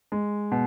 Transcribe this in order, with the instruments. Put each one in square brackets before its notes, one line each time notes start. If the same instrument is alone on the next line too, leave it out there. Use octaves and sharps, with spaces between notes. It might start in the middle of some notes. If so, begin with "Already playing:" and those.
[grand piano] G#3
B2